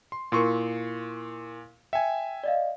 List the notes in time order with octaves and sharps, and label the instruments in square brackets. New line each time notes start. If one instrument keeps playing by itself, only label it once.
[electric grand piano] C6
[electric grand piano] A#2 C6 C#6 [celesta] E4 A#4
[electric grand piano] E5 G#5 [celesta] G5
[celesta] D5 D#5 F5